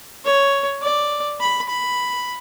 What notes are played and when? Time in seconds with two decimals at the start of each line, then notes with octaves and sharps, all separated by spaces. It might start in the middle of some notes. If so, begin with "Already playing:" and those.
0.25 C#5
0.82 D5
1.40 B5
1.69 B5